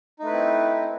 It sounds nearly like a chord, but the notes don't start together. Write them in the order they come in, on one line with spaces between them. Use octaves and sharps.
D#4 A3 B4 E4 C4